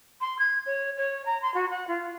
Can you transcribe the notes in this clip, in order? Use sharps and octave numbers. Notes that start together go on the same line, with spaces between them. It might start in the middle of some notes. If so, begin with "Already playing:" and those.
C6
G#6
C#5
C#5
A#5
C6
F#4
F#5
F4